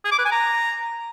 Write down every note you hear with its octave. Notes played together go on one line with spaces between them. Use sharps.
G#4
D6
B4
G#5
A#5